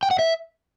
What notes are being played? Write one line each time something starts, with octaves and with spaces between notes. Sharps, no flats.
G5
F#5
E5